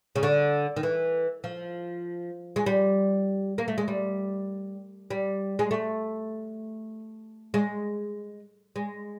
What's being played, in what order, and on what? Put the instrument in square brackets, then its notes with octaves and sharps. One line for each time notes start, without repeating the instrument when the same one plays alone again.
[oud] C#3
D3
D#3
E3
F3
G#3
G3
A#3
A3
G#3
G3
G3
G#3
A3
G#3
G#3